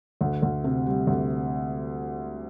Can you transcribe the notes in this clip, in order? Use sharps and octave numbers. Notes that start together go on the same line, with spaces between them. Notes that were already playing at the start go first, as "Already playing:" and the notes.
D2
D2
C3
G3
D2